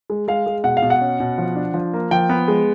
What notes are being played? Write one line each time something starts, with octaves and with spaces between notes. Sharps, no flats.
G#3
G#3 F5
G#3
B2 F#5
F5
B2
F#5
C#4
B2
F3
D4
F3
A#3
F3 G5
B3
G#3